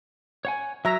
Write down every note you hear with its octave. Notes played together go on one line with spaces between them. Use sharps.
C#5 F#5 G#5
F#3 E5 A#5